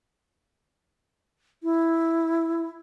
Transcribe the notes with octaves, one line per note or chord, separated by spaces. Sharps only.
E4